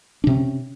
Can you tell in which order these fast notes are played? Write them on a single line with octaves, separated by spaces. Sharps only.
D4 C3 C#4